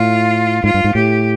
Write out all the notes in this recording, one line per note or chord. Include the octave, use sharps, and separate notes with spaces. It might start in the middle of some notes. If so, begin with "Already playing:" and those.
Already playing: A2 F4
G#2 F4
G2
G#2
A2 G4